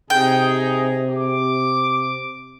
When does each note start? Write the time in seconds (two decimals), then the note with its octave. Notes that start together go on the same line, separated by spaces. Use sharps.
0.10 C3 D#4 G#4 G5
1.09 D6